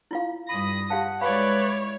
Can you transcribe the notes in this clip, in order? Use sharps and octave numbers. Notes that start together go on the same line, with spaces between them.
E4 F4 F5
G2 B5 D#6 A#6
G4 F5 F#5 A5
G#3 E4 B4 C#5 D5 F5 B5